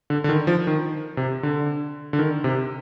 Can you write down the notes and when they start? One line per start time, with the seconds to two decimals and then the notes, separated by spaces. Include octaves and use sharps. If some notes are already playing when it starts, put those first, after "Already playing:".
0.10 D3
0.24 D3
0.29 D#3
0.47 F3
0.67 D#3
1.17 C3
1.43 D3
2.13 D3
2.19 D#3
2.44 C3